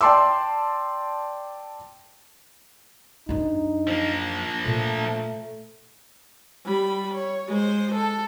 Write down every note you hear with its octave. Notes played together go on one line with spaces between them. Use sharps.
D5 G5 A5 C6 D6 E6
F#2 D4 D#4
F3 A#3
A#2 A3 F4
G3 B5
C#5
G#3 C5
A4